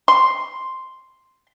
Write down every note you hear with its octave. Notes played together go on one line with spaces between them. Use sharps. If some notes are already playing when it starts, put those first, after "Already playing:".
C6